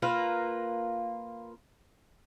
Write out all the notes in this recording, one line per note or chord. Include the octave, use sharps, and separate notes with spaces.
A#3 F4 A#4 B4